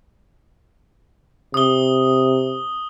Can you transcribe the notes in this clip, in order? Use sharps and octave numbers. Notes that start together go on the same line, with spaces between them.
C3 D#6 G7